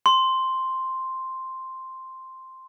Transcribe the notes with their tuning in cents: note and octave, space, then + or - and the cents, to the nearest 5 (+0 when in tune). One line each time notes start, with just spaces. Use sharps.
C6 +0